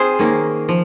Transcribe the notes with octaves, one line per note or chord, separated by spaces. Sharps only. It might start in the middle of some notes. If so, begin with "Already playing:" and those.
Already playing: C4 F4 G#4 C5
D#3 A#3 C#4
F3